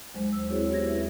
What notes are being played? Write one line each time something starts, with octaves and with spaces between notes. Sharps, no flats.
D#2 F#3 G#3 C5
E6
C4 E4 F#4 G#4 C5 C#5
D#2 B3 G4 G#6 A#6
E4 B4 E5